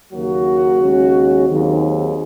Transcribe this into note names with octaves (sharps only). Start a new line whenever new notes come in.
D#2 C#3 F#3 A#3 F#4
D#2 C#3 G#3 C#4
D#2 D#3 F#3 C4 G#4